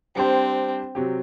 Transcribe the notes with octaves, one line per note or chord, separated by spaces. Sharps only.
G3 C4 D4 G4 C5
C3 F#3 C4 G4